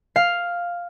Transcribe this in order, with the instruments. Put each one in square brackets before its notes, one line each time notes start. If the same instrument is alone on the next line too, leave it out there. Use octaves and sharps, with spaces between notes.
[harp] F5